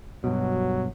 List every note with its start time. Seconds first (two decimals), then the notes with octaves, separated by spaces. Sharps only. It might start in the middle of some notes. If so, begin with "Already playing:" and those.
0.24 G2 B2 F#3